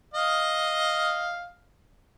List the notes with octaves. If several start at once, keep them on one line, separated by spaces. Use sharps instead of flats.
D#5 F5